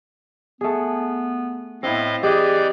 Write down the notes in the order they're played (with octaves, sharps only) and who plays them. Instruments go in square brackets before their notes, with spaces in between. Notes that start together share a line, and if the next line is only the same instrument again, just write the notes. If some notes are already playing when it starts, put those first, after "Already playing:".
[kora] A3 G#4 [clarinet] B3
[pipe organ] A2 D#5 F5 [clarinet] B3 [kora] C4 E4
[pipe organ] E3 D5 G6 [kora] G4 D#5 [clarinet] G#4